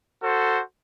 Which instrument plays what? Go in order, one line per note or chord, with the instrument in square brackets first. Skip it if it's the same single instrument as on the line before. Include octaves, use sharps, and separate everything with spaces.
[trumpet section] F#4 A4 C5